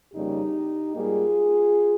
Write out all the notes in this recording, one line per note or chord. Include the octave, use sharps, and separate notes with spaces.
F2 C#3 G3 A#3 D#4 G4
G#2 G3 A#3 F4 G#4